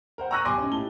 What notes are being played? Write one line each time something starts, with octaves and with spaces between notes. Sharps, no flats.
A#4 C5 F#5
A#5 C#6 E6 F#6 A#6 D#7
B1 G4 G#5 C6 D6 A#6
C#4 D#4
A2 G4 A5 G7